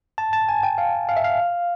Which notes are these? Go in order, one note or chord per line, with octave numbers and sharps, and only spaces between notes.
A5
A5
G#5
G5
F5
F5
E5
F5